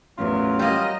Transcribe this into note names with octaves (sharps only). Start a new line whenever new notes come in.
A1 E2 F#3 F4 A#4
G3 A#3 D#5